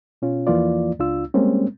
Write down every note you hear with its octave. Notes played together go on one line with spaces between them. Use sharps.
B2 C#4 F4
E2 E3 F3 A#3 F4 D5
C#2 D4 F4 E6
G3 G#3 A#3 C4 C#4